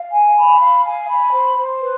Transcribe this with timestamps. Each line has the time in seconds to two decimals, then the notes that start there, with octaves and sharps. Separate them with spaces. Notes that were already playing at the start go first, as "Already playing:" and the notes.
Already playing: F5
0.10 G#5
0.35 B5
0.59 F5
0.84 G#5
1.08 B5
1.33 C5
1.57 C5
1.81 B4